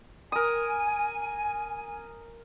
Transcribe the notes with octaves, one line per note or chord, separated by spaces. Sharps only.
A#4 G#5 D#6